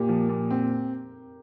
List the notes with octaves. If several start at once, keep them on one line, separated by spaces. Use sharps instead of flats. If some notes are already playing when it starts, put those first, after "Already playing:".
Already playing: A#2 G4 A#4
F3
A#2
C4